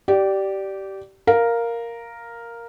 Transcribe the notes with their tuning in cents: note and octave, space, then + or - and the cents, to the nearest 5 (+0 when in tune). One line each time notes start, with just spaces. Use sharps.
G4 -20 D5 +0
A#4 +0 F5 +0